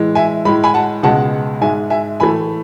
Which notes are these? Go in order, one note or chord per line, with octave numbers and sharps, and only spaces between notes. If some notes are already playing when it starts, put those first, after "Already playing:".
Already playing: A2 E3 G#3
E5 G#5
A2 G#3 B5
G#5 B5
F#5 A5
C#2 B2 G#3 F#5 A5
G#2 G#3 E5 G#5
E5 G#5
A2 E3 A3 G#5 B5